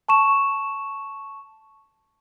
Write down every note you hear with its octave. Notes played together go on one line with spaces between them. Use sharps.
A5 C#6 E7